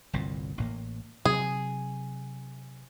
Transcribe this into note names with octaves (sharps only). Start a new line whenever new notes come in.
G1 C2 A#2
A1 A2 A#3
C3 F#3 G#4